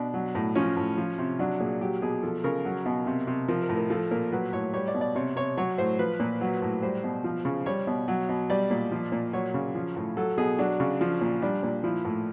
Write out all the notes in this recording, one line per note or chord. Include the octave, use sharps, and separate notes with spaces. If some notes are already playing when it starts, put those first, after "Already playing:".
Already playing: B2 D4
F#3
A2
F3 C#4
A2
F3
C3
F#3 D4
A#2 G#4
F#3 G4
B2 G#4
F3 A4
C#3 A#4
F#3
B2
C3
C3
F3 A#4
A#4
A2
A#4
F3 A4
A#2 A#4
F#3 B4
A2 C#5
G3 C#5
D5
B2
D5
C3 C#5
C3 C#5
F#3 C#5
A2 C5
F3 B4
A#2
F#3
A2
G3 C5
B2
F3
C#3
G3 C#5
B2
F#3
B2
G3 D5
A#2
F3
A#2
F#3 C#5
C#3
F3
A2
F#3 A4
B2 G#4
F#3 D4
C#3
F3
A#2
G3 D4
A#2
F3 E4
A2